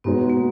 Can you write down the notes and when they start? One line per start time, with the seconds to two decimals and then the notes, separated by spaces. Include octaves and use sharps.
0.04 B2 G#3 B3 D#4 F#4 B4
0.30 A#3